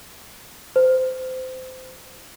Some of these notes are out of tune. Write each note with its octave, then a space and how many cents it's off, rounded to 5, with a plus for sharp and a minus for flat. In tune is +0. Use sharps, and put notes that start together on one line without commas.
C5 -25